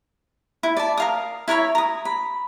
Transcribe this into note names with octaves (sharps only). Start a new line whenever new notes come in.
E4
D5 A5
A#4 F5 D#6
E4 A#4 C#5 B5
A#5 D#6
B5